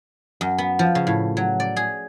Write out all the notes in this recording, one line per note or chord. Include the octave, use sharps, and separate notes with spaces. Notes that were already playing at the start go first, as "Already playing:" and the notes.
F#2
B3
F3
C#3
A2
F#3
D5
G#4